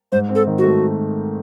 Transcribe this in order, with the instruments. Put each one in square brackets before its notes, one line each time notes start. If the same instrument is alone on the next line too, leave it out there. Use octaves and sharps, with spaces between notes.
[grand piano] G#2 [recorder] C5
[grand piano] C4
[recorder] A4
[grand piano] D#3
[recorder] F#4
[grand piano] A3